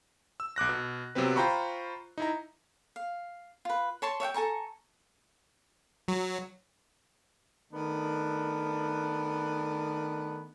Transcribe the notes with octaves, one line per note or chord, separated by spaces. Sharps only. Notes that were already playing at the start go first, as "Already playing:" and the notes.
E6
B1 D6 F#6 A#6
B2
C3 F#3 B3 C4 B4
F4 C5 G5 A#5 B5 C#6
D#4 E4 A#5
F5
F4 B4
C#5 A5 C6 C#6
C#5 E5 F#5 G5
A4 G#5 A#5 C#6
F#3
D#3 A3 B3 D4